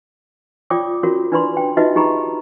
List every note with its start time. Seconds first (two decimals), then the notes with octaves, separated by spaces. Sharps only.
0.70 F4 C#5 D5 G5 D6 D#6
1.03 C#4 F4 F#4 A#4 C#5
1.32 D4 E4 B4 D5 B5 C6
1.57 G5
1.77 D#4 F4 F#4 B4 D#5 E5
1.96 D#4 G4 G#4 A#5 B5